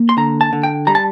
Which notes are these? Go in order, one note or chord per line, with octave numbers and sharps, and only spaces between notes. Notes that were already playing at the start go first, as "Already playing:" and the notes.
Already playing: A#3
C6
D3 A#5
A5
D3
G5
G3 A#5
A5